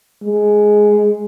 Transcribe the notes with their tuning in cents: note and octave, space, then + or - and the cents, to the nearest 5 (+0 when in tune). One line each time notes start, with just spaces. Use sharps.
G#3 +5